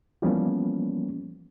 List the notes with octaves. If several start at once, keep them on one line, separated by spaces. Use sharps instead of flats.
E3 F3 G3 A#3 B3 C#4